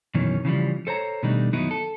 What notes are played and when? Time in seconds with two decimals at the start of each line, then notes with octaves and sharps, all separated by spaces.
0.15 F#2 B2 D#3 E3 C#4
0.45 C#3 E3 F3 G3
0.87 A4 C5 C#5 A#5
1.23 B2 D#3 G3 A3 D4 D#4
1.53 F#2 D#3 F#3 B3 D#4 E4
1.71 A4